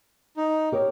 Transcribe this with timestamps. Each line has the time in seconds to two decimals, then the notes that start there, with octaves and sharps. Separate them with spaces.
0.37 D#4
0.72 G4 A#4 C#5